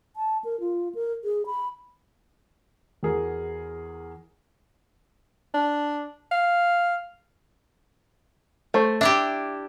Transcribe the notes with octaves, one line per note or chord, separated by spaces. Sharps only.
A5
A#4
F4
A#4
G#4
B5
E2 F#4 G#4 A#4
D4
F5
A3 C5
D4 E4 G4 E5